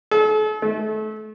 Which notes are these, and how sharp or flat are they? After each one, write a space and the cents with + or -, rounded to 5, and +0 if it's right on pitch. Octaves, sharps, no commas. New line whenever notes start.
A4 -45
A3 -30